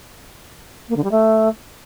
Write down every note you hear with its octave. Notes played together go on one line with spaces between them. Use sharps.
A#3
D3
G3
A3